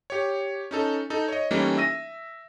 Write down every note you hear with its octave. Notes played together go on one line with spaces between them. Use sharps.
G4 C#5
C#4 D#4 A4
D#4 A4
C#5 D#5
E3 G3 A3 A#3 C#4 D#4
E5 E6 A#6 D#7